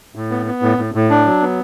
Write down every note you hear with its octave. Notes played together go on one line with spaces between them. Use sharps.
A2
B3
B3
A2
A2
A2
D4
F#3
B3